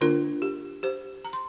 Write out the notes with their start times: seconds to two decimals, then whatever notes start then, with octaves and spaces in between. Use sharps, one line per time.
0.01 D3 A#3 D4 F4 A#4
0.42 G4
0.83 G4 C5
1.24 A#5
1.33 C6